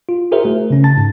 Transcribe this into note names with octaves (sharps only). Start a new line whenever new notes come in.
F4
E4 F#4 G#4 A#4 C5 E5
A3
C#3 C#4
A5 A6
G#2